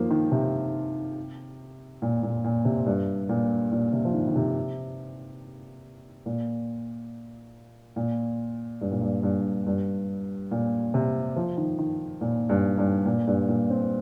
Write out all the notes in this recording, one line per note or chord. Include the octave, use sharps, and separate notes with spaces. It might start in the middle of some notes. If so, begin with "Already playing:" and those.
Already playing: D#3 F3 A#3
D#3
C3
A#2
A#2
A#2
C3
G2
A#2
A#2
C3
F3
D#3
D#3
C3
A#2
A#2
G2
A#2
G2
G2
G2
A#2
C3
F3
D#3
D#3
A#2
G2
G2
A#2
G2
A#2
C4